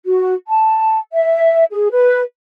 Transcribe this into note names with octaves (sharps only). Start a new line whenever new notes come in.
F#4
A5
E5
G#4
B4